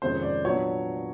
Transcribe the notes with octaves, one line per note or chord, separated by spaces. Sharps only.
F2 C3 D#3 G#3 C#4 C5
D5
A#2 F#3 B3 D4 C#5